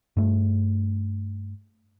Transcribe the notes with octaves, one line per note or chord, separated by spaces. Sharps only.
G2 A3